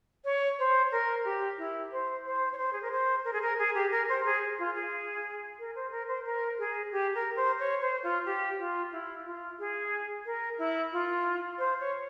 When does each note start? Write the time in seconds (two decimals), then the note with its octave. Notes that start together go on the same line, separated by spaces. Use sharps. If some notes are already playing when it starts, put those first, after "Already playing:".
0.25 C#5
0.59 C5
0.92 A#4
1.25 G4
1.58 E4
1.92 C5
2.26 C5
2.53 C#5
2.58 C5
2.73 G#4
2.82 A#4
2.92 C5
3.25 A#4
3.33 G#4
3.42 A#4
3.59 G#4
3.75 G4
3.91 A#4
4.09 C5
4.25 G#4
4.59 F4
4.75 G#4
5.59 A#4
5.75 C5
5.91 A#4
6.08 C5
6.25 A#4
6.59 G#4
6.92 G4
7.15 A#4
7.36 C5
7.59 C#5
7.81 C5
8.03 F4
8.26 G4
8.59 F4
8.92 E4
9.25 F4
9.59 G#4
10.26 A#4
10.58 E4
10.93 F4
11.59 C5
11.80 C#5